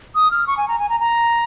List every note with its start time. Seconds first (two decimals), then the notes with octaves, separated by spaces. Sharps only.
0.15 D#6
0.31 F6
0.47 C#6
0.57 G#5
0.68 A#5
0.79 G#5
0.89 A#5
1.00 A#5